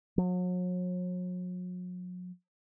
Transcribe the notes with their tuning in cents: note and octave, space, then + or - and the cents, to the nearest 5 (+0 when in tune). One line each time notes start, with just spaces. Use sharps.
F#3 -40